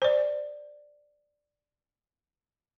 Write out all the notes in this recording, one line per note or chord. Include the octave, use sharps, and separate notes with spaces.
C5 D5